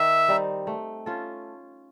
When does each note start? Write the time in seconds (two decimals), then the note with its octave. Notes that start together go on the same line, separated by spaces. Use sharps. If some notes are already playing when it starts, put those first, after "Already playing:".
Already playing: D#3 E5
0.29 G3 C4 D#4
0.67 A3
1.06 C#4 F4 A4